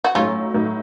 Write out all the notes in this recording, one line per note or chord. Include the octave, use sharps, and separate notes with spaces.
F#4
A2 F#3 A3 C#4 D#4 F4
A2 F#3 A3 D#4